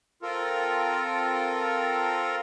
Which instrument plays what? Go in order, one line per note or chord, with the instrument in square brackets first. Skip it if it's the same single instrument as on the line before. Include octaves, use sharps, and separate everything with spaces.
[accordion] C4 F4 A4 A#4